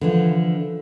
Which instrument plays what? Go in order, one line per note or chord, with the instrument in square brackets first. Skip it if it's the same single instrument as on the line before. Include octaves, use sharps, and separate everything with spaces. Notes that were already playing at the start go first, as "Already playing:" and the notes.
[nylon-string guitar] D3 E3 F3